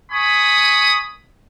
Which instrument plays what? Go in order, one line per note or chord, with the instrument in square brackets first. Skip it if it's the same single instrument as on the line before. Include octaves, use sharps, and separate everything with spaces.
[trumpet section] G#5 B5 C#6 D#6